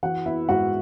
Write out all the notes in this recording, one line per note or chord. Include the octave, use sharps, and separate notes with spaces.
E3 F#4 F#5
B3 E4 E5
G#2 F#4 F#5